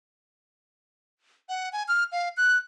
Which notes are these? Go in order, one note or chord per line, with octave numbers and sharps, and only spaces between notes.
F#5
G#5
F6
F5
F#6